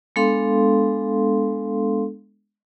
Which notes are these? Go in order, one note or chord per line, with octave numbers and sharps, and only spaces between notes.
G#3 B3 D4 A4 F5 C6